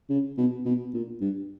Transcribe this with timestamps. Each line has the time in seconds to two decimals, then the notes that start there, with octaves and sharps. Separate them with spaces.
0.10 C#3
0.38 B2
0.65 B2
0.94 A#2
1.21 G2